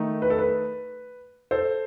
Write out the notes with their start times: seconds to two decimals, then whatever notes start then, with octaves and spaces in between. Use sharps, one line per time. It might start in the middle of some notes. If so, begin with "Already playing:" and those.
Already playing: D#3 A3 D#4
0.22 B4
0.30 A4
0.39 B4
1.51 A4 C5